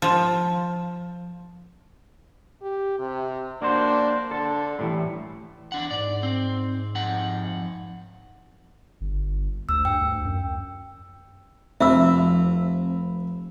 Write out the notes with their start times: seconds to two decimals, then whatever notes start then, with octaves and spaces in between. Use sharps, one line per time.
0.02 F3
2.62 G4
2.99 C3
3.62 A#3 D4 F#4 C5
4.31 D3 A4
4.79 A2 C#3 E3 G3
5.72 E2 D4 F#5
5.91 G#2 D5
6.23 C4
6.95 F2 D#4 F#5
9.01 G1
9.69 D2 E6
9.85 G2 G5
10.01 D2
10.25 F#2
11.81 F1 F3 C4 E5 B5 E6